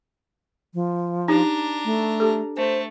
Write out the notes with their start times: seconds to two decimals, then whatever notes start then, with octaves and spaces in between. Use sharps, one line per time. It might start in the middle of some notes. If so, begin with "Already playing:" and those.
0.74 F3
1.28 D4 D#4 G4 A#5
1.85 A3
2.20 G4 A4
2.57 A3 C5